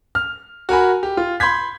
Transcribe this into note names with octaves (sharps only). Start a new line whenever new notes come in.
F6
F#4 A#4 G#5 B5
G4
F4
B5 C6 G6 G#6 B6